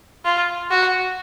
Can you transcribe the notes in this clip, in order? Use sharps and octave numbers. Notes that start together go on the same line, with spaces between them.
F4
F#4